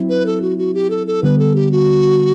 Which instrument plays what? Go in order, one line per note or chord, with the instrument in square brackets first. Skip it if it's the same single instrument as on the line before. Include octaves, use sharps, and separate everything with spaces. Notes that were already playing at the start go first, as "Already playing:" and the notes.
Already playing: [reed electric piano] F#3 C4 E4
[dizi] B4
A4
F#4
F#4
G4
A4
A4
[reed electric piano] D3 G3 B3 [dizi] B4
[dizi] A4
G4
F#4